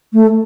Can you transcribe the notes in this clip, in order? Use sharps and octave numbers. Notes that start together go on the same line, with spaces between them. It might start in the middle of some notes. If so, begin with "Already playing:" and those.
A3